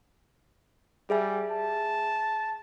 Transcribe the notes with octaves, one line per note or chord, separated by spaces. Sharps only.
G3 G#4 E5 G#5
A5